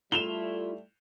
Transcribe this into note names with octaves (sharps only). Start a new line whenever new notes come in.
G3 A3 E4 F4 E7 F7 G7